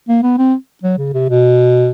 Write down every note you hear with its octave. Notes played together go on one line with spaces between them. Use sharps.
A#3
B3
C4
F#3
C#3
C3
B2